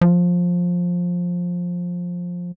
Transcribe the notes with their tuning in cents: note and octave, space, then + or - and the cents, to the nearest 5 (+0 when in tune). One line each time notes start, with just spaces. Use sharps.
F3 +15